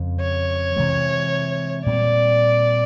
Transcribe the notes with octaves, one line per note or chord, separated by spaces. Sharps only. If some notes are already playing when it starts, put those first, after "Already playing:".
Already playing: F2 C#3 F3
C#5
C3 E3 G#3
A#2 G3 C4 D5